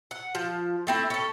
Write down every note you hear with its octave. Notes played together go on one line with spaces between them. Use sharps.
F#5
F3
A3 C4 E4
C#4 A4